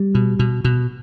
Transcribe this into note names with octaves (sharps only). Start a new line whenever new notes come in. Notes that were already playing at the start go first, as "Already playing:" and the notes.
Already playing: G3
B2
B2
B2